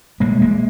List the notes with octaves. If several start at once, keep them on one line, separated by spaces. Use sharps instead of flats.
B2 G#3 A#3
G#3 A#3